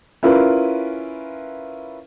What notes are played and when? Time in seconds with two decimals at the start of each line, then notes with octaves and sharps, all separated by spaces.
0.23 C#4 E4 F4 A#4 B4